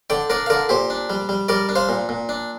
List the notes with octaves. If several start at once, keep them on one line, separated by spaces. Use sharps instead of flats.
D3 D5 G5
D4 A#4 D5
F5
D3 A#4 D5
A#2 G4 C5
D4
G3
G3
G3 A#4 D5
D4
C5 F5
A#2
A#2
D4